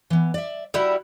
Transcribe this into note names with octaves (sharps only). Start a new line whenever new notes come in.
E3 B3
D5 E5
G3 E4 F#4